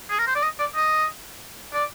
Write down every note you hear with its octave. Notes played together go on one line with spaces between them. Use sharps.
G#4
A#4
C5
D5
D#5
D5
D#5
D5